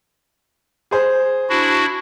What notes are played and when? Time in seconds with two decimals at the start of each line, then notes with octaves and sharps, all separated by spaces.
0.91 G#4 C5
1.50 D4 E4 F#4